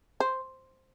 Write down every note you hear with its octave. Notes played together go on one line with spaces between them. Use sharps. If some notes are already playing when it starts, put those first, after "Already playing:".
C5